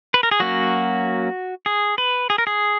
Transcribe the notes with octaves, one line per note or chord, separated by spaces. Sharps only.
B4
A#4
G#4
F#3 A#3 C#4 F#4
G#4
B4
G#4
A#4
G#4